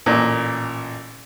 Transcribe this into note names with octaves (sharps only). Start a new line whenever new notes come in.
A1 A#2